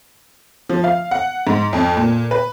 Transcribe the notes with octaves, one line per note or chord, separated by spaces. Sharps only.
F3
F5
F#5
G#2
F2
A#2
B4